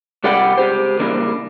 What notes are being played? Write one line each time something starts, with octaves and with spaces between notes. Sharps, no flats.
C3 G3 D5 F#5 G5
C#2 G4 C5
C#3 E3 G3 A#3 D4